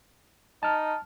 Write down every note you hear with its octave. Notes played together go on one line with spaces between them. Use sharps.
D#4 A5 F6